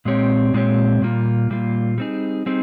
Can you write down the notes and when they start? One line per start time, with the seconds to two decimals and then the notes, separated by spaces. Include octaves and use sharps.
0.05 A#2 G#3 C4 G4 C#5
0.54 A#2 G#3 C4 G4 C#5
1.02 A#2 G3 A#3 F4
1.50 A#2 G3 A#3 F4
1.98 G3 C4 D#4 G#4
2.46 G3 C4 D#4 G#4